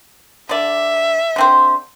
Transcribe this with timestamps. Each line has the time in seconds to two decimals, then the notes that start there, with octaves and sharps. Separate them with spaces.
0.49 D3 D5 E5
1.36 D3 C4 C5